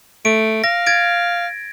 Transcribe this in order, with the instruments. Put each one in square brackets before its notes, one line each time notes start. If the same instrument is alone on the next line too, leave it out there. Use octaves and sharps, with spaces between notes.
[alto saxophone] A3 [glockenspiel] D7
[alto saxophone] F5 [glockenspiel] A#6
[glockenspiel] G#6 A6 D7